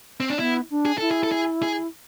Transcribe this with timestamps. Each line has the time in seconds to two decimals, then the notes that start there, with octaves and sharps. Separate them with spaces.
0.20 C4
0.30 D4
0.39 B3 E4
0.70 D4
0.85 G#4
0.98 E4 A4
1.11 G#4
1.23 A4
1.32 G#4
1.63 G#4